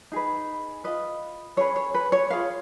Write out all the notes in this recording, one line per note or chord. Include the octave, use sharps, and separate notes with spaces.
D#4 G#4 B4
F4 B4 D#5
C#4 G#4 B4 C#5
C#5
B4
C#5
F4 G#4 B4 F5